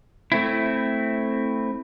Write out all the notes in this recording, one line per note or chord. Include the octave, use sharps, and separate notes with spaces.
A3 C4 E4